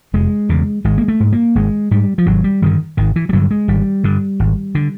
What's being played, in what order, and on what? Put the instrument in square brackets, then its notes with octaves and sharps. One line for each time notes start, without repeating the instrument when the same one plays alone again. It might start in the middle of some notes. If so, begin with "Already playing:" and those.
[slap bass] F1 G#3
E2 C#3
G#1 G#3
A#3
A3
G#2
A#3
G#1 G#3
G#2 G3
F3
G#1 F#3
G3
G2 D3 D#3
G#1 D#3
E3
G3
G2 D3 F#3
G#3
G#1 G3
G2 D3
G#1
D3